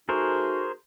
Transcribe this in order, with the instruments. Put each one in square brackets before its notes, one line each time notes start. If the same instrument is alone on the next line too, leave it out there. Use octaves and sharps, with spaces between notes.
[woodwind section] A3 D#4 F#4 [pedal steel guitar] G#4 A#4 C5